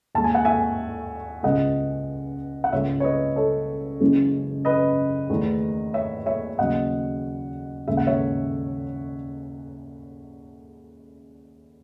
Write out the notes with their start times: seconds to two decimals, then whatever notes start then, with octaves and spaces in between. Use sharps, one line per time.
0.15 D#2 D#3 G#3 A5
0.24 G#5
0.35 F#5
0.45 E5 G#5
1.43 C#2 C#3 G#3 B3 D#5 F#5
2.64 F#5
2.73 C#2 C#3 G#3 C#5 E5
3.00 C#5
3.04 B4 D#5
3.36 A4 C#5
4.00 F#1 F#2 C#3 E3 G#3
4.65 B4 D#5
5.29 E2 D#3 A3
5.94 C#5 E5
6.26 C#5 E5
6.58 D#2 C#3 F#3 B3 D#5 F#5
7.88 D#2 C#3 G#3 E5
7.97 F#5
8.07 C#5 E5